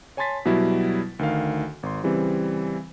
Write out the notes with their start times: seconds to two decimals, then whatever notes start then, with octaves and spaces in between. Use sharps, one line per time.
0.17 C#5 G#5 A5 C6 A6 B6
0.45 B2 F#3 G3 E4
1.19 D2 D#3 F5
1.83 G#1 C6
2.03 C#3 E3 G3 C4